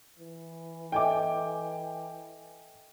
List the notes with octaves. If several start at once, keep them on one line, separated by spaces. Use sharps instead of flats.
E3
A4 D#5 E5 G5 G#5 D6